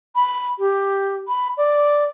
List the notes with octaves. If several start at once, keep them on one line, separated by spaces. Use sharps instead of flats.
B5
G4
B5
D5